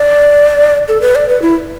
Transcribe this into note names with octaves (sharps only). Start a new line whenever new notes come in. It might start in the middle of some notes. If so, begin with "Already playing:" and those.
Already playing: D5
A4
B4
D5
B4
E4